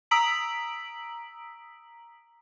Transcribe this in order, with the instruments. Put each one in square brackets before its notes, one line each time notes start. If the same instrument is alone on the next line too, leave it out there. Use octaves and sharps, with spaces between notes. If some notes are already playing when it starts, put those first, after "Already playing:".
[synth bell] A#5 D#6 E6 B6 D7 F#7